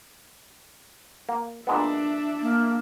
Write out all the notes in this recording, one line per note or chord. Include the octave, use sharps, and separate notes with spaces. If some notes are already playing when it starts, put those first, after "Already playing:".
A#3
A#2 G#3 B3 D4 E5
A#3